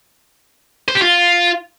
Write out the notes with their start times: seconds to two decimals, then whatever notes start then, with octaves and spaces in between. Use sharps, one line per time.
0.88 C5
0.95 G4
1.02 F4